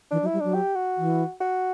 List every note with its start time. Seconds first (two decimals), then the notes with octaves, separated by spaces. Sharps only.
0.11 E3 D4
0.22 F#3
0.26 E4
0.33 G3
0.40 F#3 D4
0.54 G4
0.76 F#4
0.97 E3
1.40 F#4